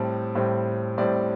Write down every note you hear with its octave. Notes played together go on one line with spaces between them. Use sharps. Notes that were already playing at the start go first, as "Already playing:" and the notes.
Already playing: A2 G3 C4 A5
A2 G3 C4
A2 G3 C4 D5